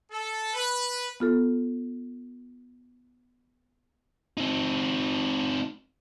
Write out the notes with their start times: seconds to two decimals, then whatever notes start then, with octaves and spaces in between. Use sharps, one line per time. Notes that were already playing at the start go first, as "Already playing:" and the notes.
0.10 A4
0.53 B4
1.20 B3 F4 A4
4.37 C4 D#4